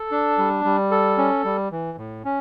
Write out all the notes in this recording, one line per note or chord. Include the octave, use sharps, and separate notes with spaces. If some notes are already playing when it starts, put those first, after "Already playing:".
Already playing: A4
D4
G3
G3
A4
C#4
G3
E3
A2
C#4